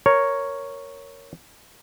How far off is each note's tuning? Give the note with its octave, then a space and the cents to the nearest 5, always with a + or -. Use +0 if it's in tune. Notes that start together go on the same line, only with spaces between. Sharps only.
A#4 +0 C#5 +0